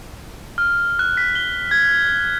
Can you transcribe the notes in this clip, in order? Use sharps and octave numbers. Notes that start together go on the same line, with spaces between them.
F6
F#6
B6
G7
G#6